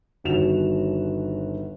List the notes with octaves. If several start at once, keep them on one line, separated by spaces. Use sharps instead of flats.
G1 D#2 F#4 E7 F7